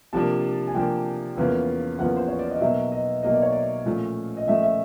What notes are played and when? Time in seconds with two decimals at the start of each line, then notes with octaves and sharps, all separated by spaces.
0.13 C3 F3 A#3 D4 A5
0.67 G#5
0.75 C3 F3 A#3 D4 G5
1.37 E2 C#3 F3 A#3
1.99 E2 C#3 F3 A#3 F#5
2.17 C5
2.28 C#5
2.39 D5
2.50 D#5
2.61 B2 F#3 A#3 D#4 E5
2.92 D#5
3.23 B2 F#3 A#3 D#4 D#5
3.33 D5
3.42 C#5
3.52 D5
3.85 A#2 F3 A3 C#4
4.37 D#5
4.47 A#2 F3 A3 C#4 E5
4.63 E5